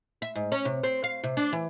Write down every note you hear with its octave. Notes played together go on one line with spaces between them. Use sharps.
E5
G#2
C#4
C3
C4
F5
C3
D4
E3